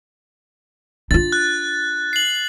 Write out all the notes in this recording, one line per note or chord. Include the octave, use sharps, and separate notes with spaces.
D4 F4 A6
F#6
C7 F#7